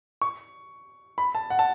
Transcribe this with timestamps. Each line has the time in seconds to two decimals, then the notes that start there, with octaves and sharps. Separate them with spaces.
0.21 C#6
1.18 B5
1.35 A5
1.50 F#5
1.59 A5